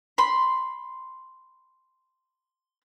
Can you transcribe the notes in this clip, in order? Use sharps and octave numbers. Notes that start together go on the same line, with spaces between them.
B5 C6